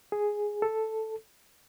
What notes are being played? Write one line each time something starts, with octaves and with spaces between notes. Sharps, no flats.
G#4
A4